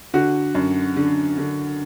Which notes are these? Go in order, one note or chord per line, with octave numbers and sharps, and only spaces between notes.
D3 F#4
F#2
D3
D3